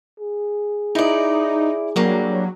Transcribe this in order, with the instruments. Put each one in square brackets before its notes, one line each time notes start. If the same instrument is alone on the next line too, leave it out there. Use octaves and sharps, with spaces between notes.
[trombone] G#4
[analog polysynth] D#4 [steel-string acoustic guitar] E4 D5
[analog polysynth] F#3 [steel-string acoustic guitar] G3 A#3 D4